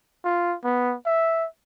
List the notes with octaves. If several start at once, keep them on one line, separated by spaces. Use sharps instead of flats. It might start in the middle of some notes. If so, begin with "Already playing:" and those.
F4
B3
E5